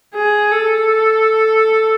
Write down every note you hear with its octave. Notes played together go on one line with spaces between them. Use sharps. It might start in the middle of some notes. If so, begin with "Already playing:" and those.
G#4
A4